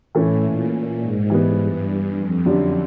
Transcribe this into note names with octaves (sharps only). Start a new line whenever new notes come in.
A2 E3 A3 C#4 E4
A#2
G#2
E3 G3 B3
G2
F2
F#2 D3 G3